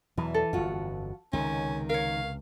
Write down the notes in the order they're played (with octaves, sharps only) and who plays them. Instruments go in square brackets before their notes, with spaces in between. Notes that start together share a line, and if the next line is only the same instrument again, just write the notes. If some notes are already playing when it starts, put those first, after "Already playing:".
[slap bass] E2 B2 F#3 [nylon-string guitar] E3
[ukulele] A4
[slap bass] G1 F2 [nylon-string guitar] F4 F#4
[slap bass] C#2 C3 [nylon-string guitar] D#3 [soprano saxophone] C#4
[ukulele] A#4 C#5 [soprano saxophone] F5